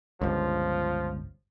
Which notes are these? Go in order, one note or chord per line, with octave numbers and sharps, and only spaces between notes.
G1 C#2 F3